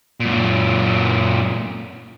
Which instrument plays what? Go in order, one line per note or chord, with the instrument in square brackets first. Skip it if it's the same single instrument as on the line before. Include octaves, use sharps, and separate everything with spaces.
[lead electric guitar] F#2 A#2